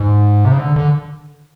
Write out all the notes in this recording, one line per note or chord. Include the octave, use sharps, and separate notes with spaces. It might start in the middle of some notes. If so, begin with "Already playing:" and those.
Already playing: G#2
C3
C#3
D3
D3